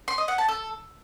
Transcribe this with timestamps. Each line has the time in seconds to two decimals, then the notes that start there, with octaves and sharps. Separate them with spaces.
0.08 C6
0.18 D#5
0.28 F#5
0.38 A5
0.48 A4